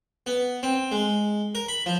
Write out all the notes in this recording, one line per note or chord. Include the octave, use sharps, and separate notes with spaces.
B3
C4
G#3
A#4
B5
F3